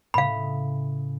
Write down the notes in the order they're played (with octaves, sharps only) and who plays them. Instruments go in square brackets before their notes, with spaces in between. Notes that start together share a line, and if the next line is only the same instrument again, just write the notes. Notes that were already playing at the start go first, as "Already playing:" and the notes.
[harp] A2 C#3 [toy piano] F5 B5